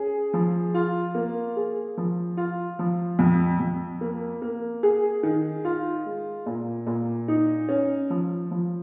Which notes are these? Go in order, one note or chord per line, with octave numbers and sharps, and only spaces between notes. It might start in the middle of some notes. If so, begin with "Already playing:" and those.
Already playing: C#4 G#4
F3
F4
A#3
G#4
F3
F4
F3
F2
F2
A#3
A#3
G#4
D#3
F4
G#3
A#2
A#2
D#4
C#4
F3
F3